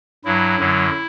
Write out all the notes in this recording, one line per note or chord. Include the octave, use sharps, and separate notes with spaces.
G2 F#3 E4
F#2 D3 F#3